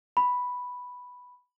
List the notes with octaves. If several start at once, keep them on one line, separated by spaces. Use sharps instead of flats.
B5